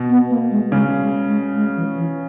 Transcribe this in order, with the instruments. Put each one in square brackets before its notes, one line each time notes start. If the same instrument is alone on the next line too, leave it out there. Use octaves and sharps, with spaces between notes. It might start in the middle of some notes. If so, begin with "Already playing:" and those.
Already playing: [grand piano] B2
[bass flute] B3
A#3
G#3
[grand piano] C#3 [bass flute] G#3
[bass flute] G#3
G#3
G#3
E3
E3